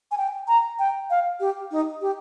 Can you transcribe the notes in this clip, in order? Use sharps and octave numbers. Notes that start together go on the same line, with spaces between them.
G#5
G5
A#5
G5
F5
G4
D#4
G4